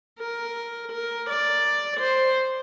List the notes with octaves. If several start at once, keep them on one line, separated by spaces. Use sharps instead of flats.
A#4
A#4
D5
C5